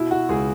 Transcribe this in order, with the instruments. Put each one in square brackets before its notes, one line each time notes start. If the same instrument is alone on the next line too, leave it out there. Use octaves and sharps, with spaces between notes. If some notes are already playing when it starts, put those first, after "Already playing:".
Already playing: [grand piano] B2 E4
F#4
C#2 G#4